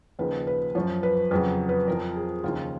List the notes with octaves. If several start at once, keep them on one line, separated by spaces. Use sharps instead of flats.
D#2 C#3 F3 B4
B4
F#2 F3 C#5
B4
F2 C#3 F#3 B4
B4
F2 F3 A#4
G#4
D#2 C#3 F3 F4